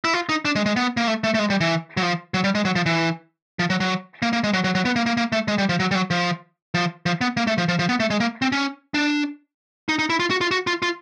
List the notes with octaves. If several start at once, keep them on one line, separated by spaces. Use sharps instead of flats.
E4
F4
D#4
D4
G#3
G#3
B3
A#3
A3
A3
A3
G#3
G3
E3
F#3
F3
F#3
G3
G#3
F#3
F3
E3
F3
F#3
F#3
A#3
A#3
G#3
F#3
F#3
F#3
B3
A#3
A#3
A#3
A3
G#3
G3
F3
F#3
G3
F#3
F3
F3
F3
B3
A#3
A3
F3
F3
F3
B3
A3
G#3
A#3
C4
C#4
D4
D#4
D#4
E4
F4
F#4
F4
F#4
F4
F4